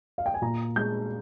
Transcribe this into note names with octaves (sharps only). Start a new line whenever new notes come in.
F5
G5
G#5
A#2 A#5
G#3 G6